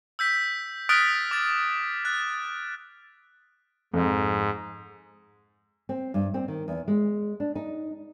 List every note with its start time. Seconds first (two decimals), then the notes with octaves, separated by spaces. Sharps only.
0.19 E6 G6 B6
0.89 D#6 F6 F#6 A6 B6 D7
1.31 D6 A6
2.05 F#6 A6
3.94 F2 G#2
5.89 C4
6.14 G2
6.34 C4
6.48 D#3
6.68 E2
6.88 G#3
7.40 D4
7.55 D#4